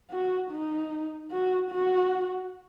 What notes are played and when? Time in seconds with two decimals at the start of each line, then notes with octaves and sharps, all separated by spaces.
0.11 F#4
0.51 D#4
1.31 F#4
1.71 F#4